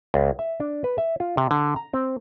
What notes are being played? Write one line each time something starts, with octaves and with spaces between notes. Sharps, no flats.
C#2
E5
D4
B4
E5
F4
C3
D3
A#5
C4